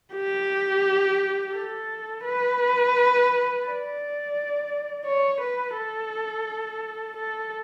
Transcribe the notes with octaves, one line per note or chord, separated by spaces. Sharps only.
G4
A4
B4
D5
C#5
B4
A4
A4